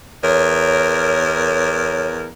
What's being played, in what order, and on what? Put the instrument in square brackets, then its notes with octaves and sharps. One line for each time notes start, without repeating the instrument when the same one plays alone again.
[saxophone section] E2 A#4 [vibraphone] C#5